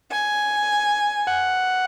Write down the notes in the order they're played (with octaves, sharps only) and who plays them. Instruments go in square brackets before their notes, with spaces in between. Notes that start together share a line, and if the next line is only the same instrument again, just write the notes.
[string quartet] G#5
[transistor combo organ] F#5